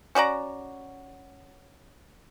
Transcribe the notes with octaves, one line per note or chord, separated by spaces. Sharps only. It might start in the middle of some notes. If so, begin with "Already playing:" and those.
C#4 F#4 D5 A#5